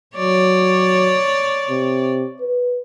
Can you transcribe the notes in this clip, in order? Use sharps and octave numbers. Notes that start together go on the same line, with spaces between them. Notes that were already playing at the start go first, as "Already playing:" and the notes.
F#3 C#5 D5
C3
B4